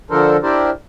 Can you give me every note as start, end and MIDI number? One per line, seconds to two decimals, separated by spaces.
0.11 0.37 50
0.11 0.37 53
0.11 0.37 62
0.11 0.37 69
0.11 0.37 70
0.11 0.37 72
0.43 0.70 62
0.43 0.70 64
0.43 0.70 67
0.43 0.70 70
0.43 0.70 72
0.43 0.70 74